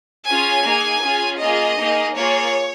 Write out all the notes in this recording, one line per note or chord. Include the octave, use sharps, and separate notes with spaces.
C#4 F4 G#4 G#5
A#3 D#4 G#4
C#4 F4 G#4
A#3 F4 G#4 D#5
A#3 D#4 G#4
A#3 F4 G#4 C#5